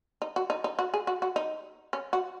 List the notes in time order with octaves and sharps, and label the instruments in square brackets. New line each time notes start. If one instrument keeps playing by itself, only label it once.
[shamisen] D#4
F#4
D#4
D#4
F#4
G#4
F#4
F#4
D#4
C#4
F#4